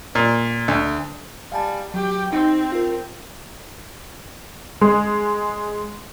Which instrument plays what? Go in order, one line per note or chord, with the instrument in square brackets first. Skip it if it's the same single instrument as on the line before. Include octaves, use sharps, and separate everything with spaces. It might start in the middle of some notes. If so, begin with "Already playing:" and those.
[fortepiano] A#2
D2
[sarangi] G3 [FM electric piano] F5 G#5 A5
[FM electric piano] F#3 [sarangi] G4
[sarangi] C4 [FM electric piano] D#4
[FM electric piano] F4 A#4
[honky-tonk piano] G#3